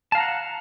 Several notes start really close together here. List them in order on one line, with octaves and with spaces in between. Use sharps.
A5 F5 A#5 F#5